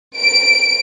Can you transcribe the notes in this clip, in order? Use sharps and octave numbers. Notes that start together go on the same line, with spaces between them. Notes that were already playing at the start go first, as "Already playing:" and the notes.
D7